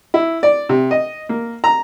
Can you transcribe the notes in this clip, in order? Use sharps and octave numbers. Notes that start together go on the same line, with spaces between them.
E4
D5
C3
D#5
A#3
A#5